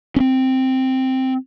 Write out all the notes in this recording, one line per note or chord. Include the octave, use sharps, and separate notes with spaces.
C4 C#4